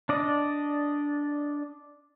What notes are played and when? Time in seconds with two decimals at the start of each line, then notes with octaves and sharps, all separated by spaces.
0.09 D4 D5 D#5